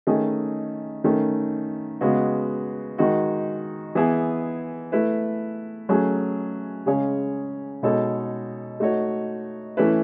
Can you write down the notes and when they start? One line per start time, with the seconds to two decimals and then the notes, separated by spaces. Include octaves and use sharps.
0.07 D#3 A3 C#4 G#4 D#5
1.04 D#3 A3 C#4
2.01 C#3 G#3 B3 F#4
2.98 D#3 G#3 D#4 F#4
3.95 E3 B3 E4 G#4
4.92 A3 E4 B4
5.89 F#3 A3 C#4 G#4
6.86 C#3 G#3 C#4 G#4 C#5
7.83 B2 G#3 D#4 A4 C#5
8.80 A3 D#4 F#4 C#5
9.77 E3 A3 C#4 E4 B4